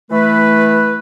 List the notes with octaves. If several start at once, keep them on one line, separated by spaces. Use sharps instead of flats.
E3 A3 B4